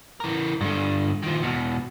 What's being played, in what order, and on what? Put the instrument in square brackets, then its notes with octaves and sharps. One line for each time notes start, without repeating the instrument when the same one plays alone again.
[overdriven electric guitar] E3 A#4
G2 D3
D#3 F3
E2 B2